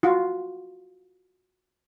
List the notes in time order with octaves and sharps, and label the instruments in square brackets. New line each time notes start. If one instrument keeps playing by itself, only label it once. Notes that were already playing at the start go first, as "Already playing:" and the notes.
[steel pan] F4 F#4